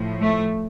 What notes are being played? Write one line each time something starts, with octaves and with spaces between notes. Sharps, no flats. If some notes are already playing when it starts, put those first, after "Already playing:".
Already playing: A2 F3
A3